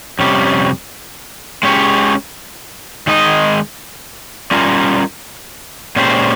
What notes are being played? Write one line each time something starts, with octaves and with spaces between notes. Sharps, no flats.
F2 C3 G3 C#4 G4
G#3 C#4 G4 C#5
D#3 G#3 D#4 A#4 D#5
G3 C#4 F4 A#4
A#2 G#3 C#4 G4 C5